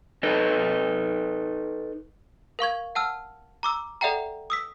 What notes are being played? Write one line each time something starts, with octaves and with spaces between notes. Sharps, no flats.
D#4 A4 B4 D#5
A#4 F5 C#6 G#6
F#5 A5 E6 F6
A#5 D6 E6
A4 D5 E5 F#5 G5 A#5
D#6 E6 B6